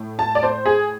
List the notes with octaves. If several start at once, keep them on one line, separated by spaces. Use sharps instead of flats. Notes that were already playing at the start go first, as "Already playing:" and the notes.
Already playing: A2
A5
D5
C5
G#4